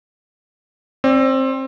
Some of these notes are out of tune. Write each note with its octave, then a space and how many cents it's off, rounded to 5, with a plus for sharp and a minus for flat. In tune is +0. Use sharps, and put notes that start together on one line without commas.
C4 +20 D5 -15